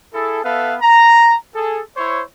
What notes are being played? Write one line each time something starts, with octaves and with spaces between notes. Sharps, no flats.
E4 G#4 A4
B3 A4 B4 E5 F5
A#5
G#4 A4
E4 C5 C#5